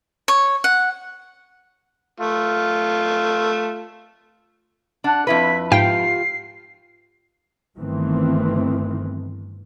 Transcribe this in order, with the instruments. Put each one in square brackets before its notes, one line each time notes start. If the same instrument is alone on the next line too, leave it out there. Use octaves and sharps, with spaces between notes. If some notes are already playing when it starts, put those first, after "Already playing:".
[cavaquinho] C#5
F#5
[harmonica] A3 F4
[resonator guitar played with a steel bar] D4 [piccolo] F#5
[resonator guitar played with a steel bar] F2 E4 B4 [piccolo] B6
[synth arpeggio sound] G#2 G5 [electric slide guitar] F4 G4 F5 [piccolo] C7
[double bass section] G1 G2 D#3 E3 A3 C4